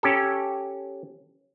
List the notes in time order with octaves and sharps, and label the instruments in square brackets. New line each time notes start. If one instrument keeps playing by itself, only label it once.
[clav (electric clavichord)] C#4 G4 A4